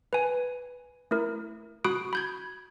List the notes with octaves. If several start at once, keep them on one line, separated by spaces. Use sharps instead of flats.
B4 G#5
A3 E4 A#4
F#4 B5 D#6 F#6 D7
B5 G6 G#6